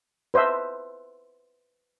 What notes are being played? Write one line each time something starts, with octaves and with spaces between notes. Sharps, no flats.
B4 C5 D#5 E5 A5